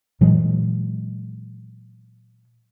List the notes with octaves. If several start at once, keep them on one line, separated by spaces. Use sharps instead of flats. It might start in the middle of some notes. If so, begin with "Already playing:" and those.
A#2 E3 F#3 G#3